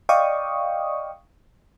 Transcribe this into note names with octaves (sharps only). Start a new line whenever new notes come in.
D5 D#5 F5 G5 C#6 D#6